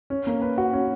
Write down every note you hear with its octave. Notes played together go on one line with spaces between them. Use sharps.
C#4
A#3
B4
F#4
C#4